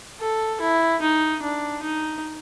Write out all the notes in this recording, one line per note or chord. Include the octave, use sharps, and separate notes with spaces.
A4
E4
D#4
D4
D#4